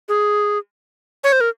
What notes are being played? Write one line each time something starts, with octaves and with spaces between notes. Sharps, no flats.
G#4
C#5
C5
A#4